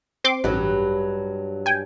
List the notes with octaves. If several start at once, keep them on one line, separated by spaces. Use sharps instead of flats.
C4 C6 D6
A1 G2 F#3
G5 G#5